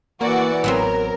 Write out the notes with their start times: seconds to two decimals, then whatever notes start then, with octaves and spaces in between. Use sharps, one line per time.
0.21 E3 A#3 F#4 D5 F#5
0.64 A1 F#3 B3 C4 A#4